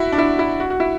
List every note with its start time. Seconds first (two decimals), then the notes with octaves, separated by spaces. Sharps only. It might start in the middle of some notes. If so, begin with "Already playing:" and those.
Already playing: E4 F#4
0.12 D4
0.18 E4
0.39 E4
0.60 F#4
0.70 F#4
0.80 E4